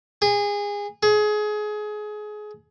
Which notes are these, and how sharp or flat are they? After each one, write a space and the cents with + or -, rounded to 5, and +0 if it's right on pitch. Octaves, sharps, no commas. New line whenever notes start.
G#4 -25
G#4 +25